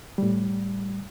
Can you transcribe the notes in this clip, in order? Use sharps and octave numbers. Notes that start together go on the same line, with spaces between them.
A2 G3